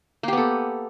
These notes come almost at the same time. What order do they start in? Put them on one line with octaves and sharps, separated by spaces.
A#3 G4 B3 A4